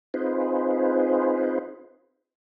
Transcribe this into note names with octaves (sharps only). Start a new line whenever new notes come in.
C4 D#4 F4 G#4 B4 C5